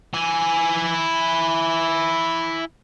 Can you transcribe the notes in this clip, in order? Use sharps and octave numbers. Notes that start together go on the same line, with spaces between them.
E4 G#5